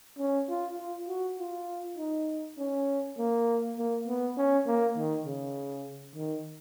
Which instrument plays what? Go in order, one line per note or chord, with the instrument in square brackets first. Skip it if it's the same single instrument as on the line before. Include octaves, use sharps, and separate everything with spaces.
[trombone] C#4
F4
F4
F#4
F4
D#4
C#4
A#3
A#3
B3
C#4
A#3
D#3
C#3
D#3